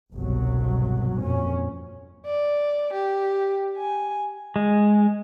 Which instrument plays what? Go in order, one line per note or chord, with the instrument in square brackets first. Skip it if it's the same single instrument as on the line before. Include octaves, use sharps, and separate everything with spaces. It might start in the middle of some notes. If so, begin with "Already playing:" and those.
[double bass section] G1 C2 B2 F#3
F2 A#2 C#4
[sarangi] D5
G4
G#5
[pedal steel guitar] G#3